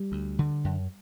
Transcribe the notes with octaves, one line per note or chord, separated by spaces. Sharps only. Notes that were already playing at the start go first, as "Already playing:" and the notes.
Already playing: G3
D2
D3
F#2